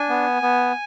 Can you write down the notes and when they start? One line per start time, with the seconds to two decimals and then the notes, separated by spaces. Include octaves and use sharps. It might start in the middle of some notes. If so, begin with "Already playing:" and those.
Already playing: D4 G#5
0.09 B3
0.42 B3